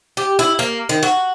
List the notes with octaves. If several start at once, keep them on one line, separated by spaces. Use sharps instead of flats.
G4
E4
A#3
D#3
F#4